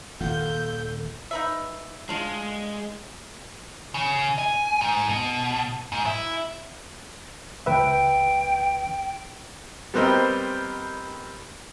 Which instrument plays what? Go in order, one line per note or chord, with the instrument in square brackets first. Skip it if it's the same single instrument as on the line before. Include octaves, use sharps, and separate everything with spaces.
[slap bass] D#1 D#3 A#3 [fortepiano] F4 F#5 [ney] A4 [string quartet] G6
[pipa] D#4 B4 E5
[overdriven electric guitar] G#3 [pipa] D4 F4
[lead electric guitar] C#3
G#5
G#2
B2
G#2
E4
[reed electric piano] C#2 B4 E5 [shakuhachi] G5
[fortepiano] G3 B3 C4 A#4 C5 D#5